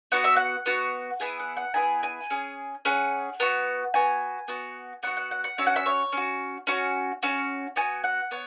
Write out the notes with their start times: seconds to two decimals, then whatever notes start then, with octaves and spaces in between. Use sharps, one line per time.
0.12 B3 F#4 F#5
0.24 E5
0.37 F#5
0.66 B3 F#4
1.20 B3 E4 G#4 G#5
1.39 F#5
1.57 F#5
1.74 B3 E4 G#4 G#5
2.03 G#5
2.30 C#4 G#4
2.85 C#4 G#4 F#5
3.40 B3 F#4
3.94 B3 F#4 G#5
4.48 B3 F#4
5.03 B3 F#4 F#5
5.17 F#5
5.31 F#5
5.44 F#5
5.58 C#4 F#4 E5
5.67 F#5
5.76 E5
5.86 C#5
6.12 C#4 F#4
6.67 C#4 F#4
7.23 C#4 F#4
7.76 B3 F#4 G#5
8.04 F#5
8.31 B3 C#5